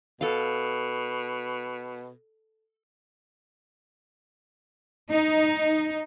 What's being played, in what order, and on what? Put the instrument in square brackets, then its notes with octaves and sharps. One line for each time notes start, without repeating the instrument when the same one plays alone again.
[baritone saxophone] B2 [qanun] A4 F5
[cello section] D#4